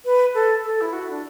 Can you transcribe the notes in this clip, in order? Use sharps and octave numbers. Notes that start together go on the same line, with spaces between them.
B4
A4
A4
E4
F#4
D4